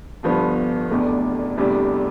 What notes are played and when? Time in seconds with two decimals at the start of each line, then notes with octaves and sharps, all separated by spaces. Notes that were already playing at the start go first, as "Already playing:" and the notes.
0.23 G1 G2 F3 B3
0.90 F1 E2 B2 A3 D4
1.57 F1 E2 C3 G3 D4